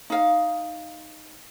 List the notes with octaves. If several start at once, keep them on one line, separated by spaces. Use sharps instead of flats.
D#4 F5